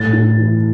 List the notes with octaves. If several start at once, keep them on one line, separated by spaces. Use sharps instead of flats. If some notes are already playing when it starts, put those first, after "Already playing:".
Already playing: A2 A6
A2
E3